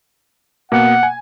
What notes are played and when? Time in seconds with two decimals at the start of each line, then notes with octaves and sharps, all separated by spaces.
0.72 B2 A#3 F#5
1.03 G#5